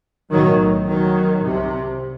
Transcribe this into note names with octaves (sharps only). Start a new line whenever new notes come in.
B1 A2 D#3 F#3
D#3 F#3
C2 C3